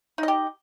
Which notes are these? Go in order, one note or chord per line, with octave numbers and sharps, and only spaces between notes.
D#4 G4 D#5